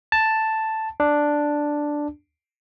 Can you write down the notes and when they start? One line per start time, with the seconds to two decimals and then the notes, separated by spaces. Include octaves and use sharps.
0.12 A5
1.00 D4